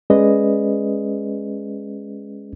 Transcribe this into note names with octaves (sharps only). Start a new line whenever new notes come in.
G#3 C#4 G#4 B4 D5 D#5